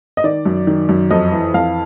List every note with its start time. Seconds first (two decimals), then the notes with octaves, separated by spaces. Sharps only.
0.17 D#5
0.24 D#3 D5
0.46 F#2
0.67 D#3
0.89 F#2
1.11 F2 D#5
1.32 E3
1.54 F2 F5